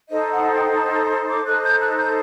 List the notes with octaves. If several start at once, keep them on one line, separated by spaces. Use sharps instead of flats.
D#4 A4 C5 D#5
F#5
G5
A5
A#5
C6
D6
D#4 A4 C5 F#6
G6
F#6
G6